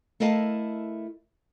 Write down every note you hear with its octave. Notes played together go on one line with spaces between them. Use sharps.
A3 E4 A#4 D#5 F5 A5